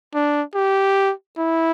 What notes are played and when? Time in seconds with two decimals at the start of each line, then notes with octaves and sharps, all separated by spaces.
0.14 D4
0.55 G4
1.38 E4